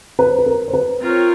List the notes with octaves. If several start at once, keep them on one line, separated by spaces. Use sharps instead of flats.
B4
C5
B4
A#4
C5
B4
C4 F4 A#4 C#5